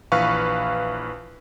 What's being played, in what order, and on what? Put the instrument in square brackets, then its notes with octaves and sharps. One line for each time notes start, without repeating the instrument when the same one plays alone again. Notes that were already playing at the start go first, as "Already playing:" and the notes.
[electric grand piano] A#1 E3 B4 F5 C#6